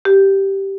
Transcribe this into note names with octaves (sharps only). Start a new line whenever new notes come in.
G4